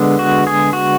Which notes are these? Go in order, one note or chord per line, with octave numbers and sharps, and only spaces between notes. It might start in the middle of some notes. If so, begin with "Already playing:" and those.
Already playing: D3 G#3 B3
F#4
G#4
F#4